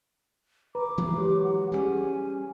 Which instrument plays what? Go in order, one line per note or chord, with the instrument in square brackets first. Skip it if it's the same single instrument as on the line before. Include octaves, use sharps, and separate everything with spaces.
[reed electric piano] B4 [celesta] A#5 [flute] D6
[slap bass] E3 F#3 G#3
[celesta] G4 C#5
[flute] F#5
[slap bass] G3 A3 C#4 [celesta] G4 G#4 [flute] G#5